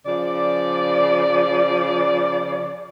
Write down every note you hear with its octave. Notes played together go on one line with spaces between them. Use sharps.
C#3 F3 D5